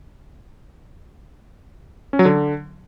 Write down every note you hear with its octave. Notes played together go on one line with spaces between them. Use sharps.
C#4
F#3
D3